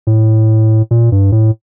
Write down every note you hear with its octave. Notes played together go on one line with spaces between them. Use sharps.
A2
A#2
G2
A2